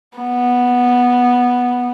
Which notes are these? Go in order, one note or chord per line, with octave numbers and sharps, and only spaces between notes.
B3